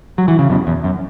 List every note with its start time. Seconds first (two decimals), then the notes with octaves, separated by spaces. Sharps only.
0.18 F#3
0.28 E3
0.39 C#3
0.50 F#2 B2
0.67 E2
0.84 F#2